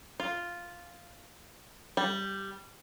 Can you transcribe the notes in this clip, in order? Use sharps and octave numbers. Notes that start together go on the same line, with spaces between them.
F4
G3